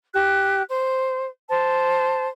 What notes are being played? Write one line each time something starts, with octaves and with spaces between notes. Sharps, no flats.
G4 F#6
C5
C5 A5